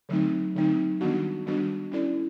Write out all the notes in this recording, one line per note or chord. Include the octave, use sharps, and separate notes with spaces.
D3 F#3 A3 C4 D#4
D3 F#3 A3 C4 D#4
D#3 G3 B3 D4 F#4
D#3 G3 B3 D4 F#4
C#4 E4 A4 D5